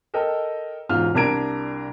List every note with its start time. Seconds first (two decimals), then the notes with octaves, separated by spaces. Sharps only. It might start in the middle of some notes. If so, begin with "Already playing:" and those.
0.14 A4 A#4 D#5 G5
0.89 E1 G#2 F4 F6
1.14 C2 D4 A#4 A#5 G#6 D7